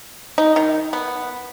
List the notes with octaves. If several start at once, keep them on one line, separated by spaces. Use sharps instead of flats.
D#4
D#3
B3